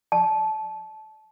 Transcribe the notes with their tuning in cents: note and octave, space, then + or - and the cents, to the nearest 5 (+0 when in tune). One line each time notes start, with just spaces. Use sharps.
A5 -20